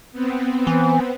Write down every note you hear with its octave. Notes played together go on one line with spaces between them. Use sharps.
B3 C4
E3